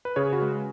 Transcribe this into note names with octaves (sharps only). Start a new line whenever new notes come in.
B4
C#3 G#4 C#5
F#4 B4
G#3